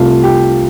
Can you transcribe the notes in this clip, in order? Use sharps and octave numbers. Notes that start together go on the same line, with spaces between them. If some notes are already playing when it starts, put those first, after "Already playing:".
Already playing: C2 C3 A3 F4
G4